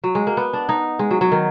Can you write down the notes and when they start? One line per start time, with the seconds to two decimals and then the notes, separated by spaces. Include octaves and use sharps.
0.04 F#3
0.15 G#3
0.27 A#3
0.37 B3
0.53 D4
0.69 D#4
0.99 G#3
1.11 F#3
1.21 F#3
1.32 D#3